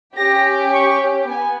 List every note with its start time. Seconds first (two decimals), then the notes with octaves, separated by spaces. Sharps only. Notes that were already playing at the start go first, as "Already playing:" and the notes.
0.18 C#4 G4 A#6
0.74 C#6
1.29 B3 G#5